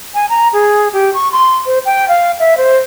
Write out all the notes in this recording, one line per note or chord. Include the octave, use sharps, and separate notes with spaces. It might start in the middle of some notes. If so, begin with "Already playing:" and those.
G#5
A#5
G#4
G4
C#6
C6
C5
G5
F5
E5
C5